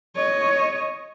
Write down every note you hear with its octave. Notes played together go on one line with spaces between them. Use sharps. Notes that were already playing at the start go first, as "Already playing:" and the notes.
C#5 D#5